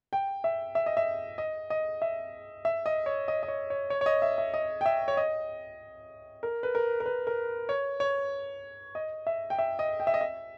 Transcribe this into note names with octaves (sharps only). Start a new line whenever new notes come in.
G5
E5
E5
D#5
E5
D#5
D#5
E5
E5
D#5
C#5
D#5
D#5
C#5
C#5
C#5
C#5
D#5
E5
E5
D#5
G5
E5
C#5
D#5
A#4
B4
A#4
A#4
B4
A#4
C#5
C#5
D#5
E5
G5
E5
D#5
G5
E5
D#5
E5